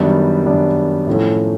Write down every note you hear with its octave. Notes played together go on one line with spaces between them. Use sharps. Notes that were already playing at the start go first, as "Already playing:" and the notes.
Already playing: F#2 D#3 G3 B3 D4
F#2 D#3 G3 B3 D4
A2 F3 A3 C#4 E4